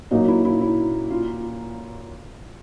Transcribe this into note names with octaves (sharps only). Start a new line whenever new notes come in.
A#2 F#3 A#3 D#4
E4
E4
E4
F4